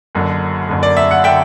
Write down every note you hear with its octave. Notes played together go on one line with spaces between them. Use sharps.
F#1 F#2 D3
F#1 F#2 D3
D5
E5
F#5
D3 E5 G5